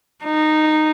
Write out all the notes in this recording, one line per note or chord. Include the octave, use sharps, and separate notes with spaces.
D#4